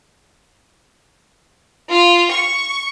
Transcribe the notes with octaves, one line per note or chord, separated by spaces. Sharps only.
F4
C#6